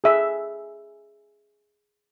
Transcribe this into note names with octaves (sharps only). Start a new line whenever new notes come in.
G#4 E5